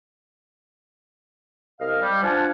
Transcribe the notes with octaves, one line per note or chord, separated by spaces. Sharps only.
C2 D#5 F5 F6
G3
F3 D4 F4 F5 F#5 G#5